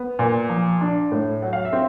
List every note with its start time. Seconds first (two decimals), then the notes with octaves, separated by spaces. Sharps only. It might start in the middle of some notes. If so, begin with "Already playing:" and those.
Already playing: B3
0.19 A#2
0.50 F3
0.81 D4
1.12 A2
1.42 F#3 F#5
1.53 F5
1.65 E5
1.73 C4